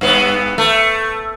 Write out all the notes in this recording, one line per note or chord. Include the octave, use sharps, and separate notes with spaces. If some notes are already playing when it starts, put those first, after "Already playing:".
G2 B3
A3